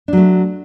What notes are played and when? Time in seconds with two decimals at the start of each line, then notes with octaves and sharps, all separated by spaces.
0.08 D4
0.13 F#3
0.17 A3